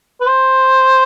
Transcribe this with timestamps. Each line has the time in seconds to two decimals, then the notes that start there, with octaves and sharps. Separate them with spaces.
0.21 B4
0.27 C5